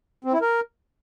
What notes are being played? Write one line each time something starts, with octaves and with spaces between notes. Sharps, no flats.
C4
E4
A#4